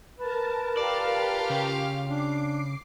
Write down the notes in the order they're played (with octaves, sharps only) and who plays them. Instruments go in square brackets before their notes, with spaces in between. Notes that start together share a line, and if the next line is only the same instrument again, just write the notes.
[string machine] A#4 A5 [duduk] B4
[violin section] F4 G4 F5 [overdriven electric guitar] D5
[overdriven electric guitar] C#3
[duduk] D4 [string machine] D6 C7